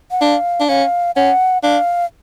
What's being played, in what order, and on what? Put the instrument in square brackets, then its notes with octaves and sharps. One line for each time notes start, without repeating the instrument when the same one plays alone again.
[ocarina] F#5
[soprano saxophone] D4 [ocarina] F5
[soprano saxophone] D4
[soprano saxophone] C#4 [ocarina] F5
[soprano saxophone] C#4 [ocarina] F#5
[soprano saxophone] D4 [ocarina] F5